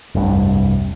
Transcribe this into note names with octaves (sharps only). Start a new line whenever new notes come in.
F1 C2 G2